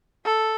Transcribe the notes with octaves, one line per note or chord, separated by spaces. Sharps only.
A4